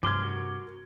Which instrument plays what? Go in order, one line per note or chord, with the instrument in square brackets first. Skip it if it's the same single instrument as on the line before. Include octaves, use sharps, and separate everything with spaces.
[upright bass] G2 C3 [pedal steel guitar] F3 C6 F6 [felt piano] D6 G#6
[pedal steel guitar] F#4 A#4